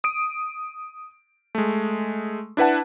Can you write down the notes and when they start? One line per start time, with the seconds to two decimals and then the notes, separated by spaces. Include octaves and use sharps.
0.04 D#6 D7
1.55 G#3 A3
2.57 D4 E4 B4 F#5 A5